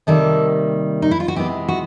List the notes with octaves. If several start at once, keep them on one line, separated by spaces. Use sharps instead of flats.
C3 D#3 G3 A#3 A4
D#4
E4
F4
F#4
C3 E3 G#3 B3 G4
F#4